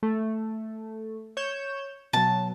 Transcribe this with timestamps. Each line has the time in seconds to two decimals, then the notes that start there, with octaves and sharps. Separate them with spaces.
0.03 A3
1.37 C#5 G6 E7
2.13 B2 F#3 A5